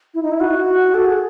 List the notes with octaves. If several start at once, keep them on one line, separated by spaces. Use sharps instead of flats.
E4
D#4
E4
F#4
A4
G#4